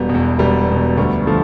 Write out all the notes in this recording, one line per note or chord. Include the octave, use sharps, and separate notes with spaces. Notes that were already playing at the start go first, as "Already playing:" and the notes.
Already playing: E1 G3 B3
E2 B2
E1 G3 B3
E2 B2
D2 G3 B3
D3 F3 A3